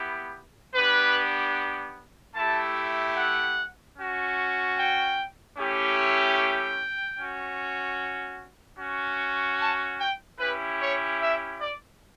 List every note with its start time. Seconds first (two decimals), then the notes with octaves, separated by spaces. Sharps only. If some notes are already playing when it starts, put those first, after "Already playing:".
Already playing: B3 E4 G4
0.74 B3 D4 G4 B4
2.35 A3 E4 G4 A5
3.15 F#5
3.95 C#4 F#4
4.76 G5
5.56 A3 C#4 E4 G4
6.37 G5
7.18 C#4 F#4
8.79 C#4 F#4
9.59 A5
9.99 G5
10.39 C#4 E4 G4 B4
10.80 C#5
11.20 E5
11.60 D5